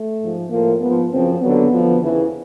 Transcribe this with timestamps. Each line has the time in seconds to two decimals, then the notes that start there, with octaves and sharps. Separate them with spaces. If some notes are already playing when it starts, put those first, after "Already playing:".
Already playing: A3
0.21 G#2 F3
0.51 A2 F3 A#3
0.81 G#2 F3 B3
1.11 F#2 C#3 F3 C4
1.41 D#2 D3 F#3 B3
1.71 D2 D3 F3
2.01 E2 C#3 E3